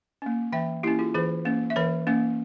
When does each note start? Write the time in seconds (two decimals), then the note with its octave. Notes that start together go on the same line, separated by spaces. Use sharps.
0.22 A#3 C#4
0.52 E3 E5 G5
0.83 A#3 E4 G4
0.87 C#4
0.99 F4 G#4
1.14 E3 G#4 C5
1.45 A#3 C#4
1.70 E5
1.76 E3 A#4 C#5
2.07 A#3 C#4